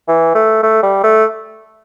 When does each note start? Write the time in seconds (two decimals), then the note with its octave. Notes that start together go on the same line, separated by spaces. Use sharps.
0.08 E3
0.35 A3
0.63 A3
0.83 G3
1.03 A3